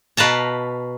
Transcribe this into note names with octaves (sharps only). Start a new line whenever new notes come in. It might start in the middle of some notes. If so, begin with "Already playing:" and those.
B2 B4 F5 A5 A#5